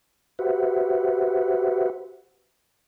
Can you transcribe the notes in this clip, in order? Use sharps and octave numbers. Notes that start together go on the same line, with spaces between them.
F#4 G4 B4 C5 E5 F#5